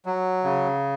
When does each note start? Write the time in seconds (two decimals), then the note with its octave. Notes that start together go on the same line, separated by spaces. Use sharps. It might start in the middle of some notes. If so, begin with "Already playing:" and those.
0.06 F#3
0.44 C#3